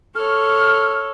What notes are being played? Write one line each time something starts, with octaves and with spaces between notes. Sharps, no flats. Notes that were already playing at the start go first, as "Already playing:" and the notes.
A4 C#5 F6